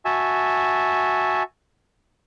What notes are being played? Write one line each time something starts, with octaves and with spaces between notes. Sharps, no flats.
F#4 E5 G#5 A5